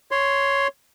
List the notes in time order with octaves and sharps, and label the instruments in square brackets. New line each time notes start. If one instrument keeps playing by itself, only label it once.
[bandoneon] C#5 C6